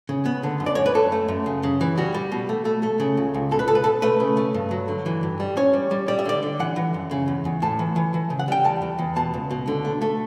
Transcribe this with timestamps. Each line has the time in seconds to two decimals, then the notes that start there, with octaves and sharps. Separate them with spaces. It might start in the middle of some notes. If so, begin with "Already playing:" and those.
0.09 C#3
0.26 B3
0.43 D3
0.60 F#2
0.66 D5
0.75 F#2 C#5
0.86 B4
0.95 F#2 A4
1.12 A3
1.28 F#2
1.46 C#3
1.63 C#3
1.81 E3
1.98 G3 F#4
2.14 G3
2.32 B2
2.49 A3
2.65 A3
2.83 A3
3.00 C#3
3.17 C#2
3.34 C#2
3.51 B2 A4
3.59 B4
3.68 B2 A4
3.75 B4
3.84 B2 A4
4.02 A3 B4
4.20 C#3
4.37 A3
4.54 G2
4.71 F#3
4.88 D3
5.06 E3
5.23 G2
5.40 G3
5.57 C#4 C#5
5.74 G3
5.91 G3
6.08 G3 D5
6.19 E5
6.25 D3 D5
6.43 D3
6.59 E3 F#5
6.76 E3
6.94 F#2
7.11 C#3
7.28 E2
7.45 E2
7.62 A2 A5
7.79 E3
7.96 E3
8.14 E3
8.30 C#3
8.39 F#5
8.48 G3 G5
8.64 E2 A5
8.82 E2
8.99 E2
9.16 B2 A5
9.34 C#2
9.51 B2
9.68 D3
9.85 A3
10.02 A3